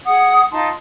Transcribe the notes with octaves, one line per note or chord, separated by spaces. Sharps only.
G#4 F#5 D#6
D#4 F4 A5 C6